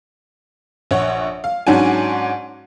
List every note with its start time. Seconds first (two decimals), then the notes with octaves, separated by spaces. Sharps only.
0.91 A#1 C#5 F#5
1.44 F5
1.67 G#2 F#3 C#4 D4 F#5 G#5